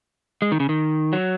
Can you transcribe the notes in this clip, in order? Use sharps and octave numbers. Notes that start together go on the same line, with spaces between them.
G#3
D#3
C#3
D#3
F#3